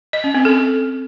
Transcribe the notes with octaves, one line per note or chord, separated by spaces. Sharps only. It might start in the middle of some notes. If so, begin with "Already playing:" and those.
D#5
C#4
C4
A4